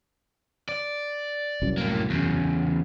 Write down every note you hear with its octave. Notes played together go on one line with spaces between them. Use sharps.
D5
C2 F#2
A2 A#3
E2 C#3